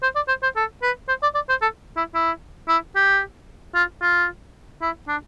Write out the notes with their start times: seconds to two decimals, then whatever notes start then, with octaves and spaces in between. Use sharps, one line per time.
0.03 C5
0.15 D5
0.28 C5
0.43 C5
0.56 A4
0.83 B4
1.08 C5
1.23 D5
1.35 D5
1.49 C5
1.62 A4
1.97 E4
2.15 E4
2.68 E4
2.96 G4
3.75 F4
4.02 F4
4.82 E4
5.08 D4